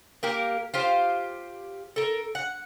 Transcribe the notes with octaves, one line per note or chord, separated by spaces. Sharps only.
A#3 G4 A#4
F4 G4 C5
A4 A#4
F#5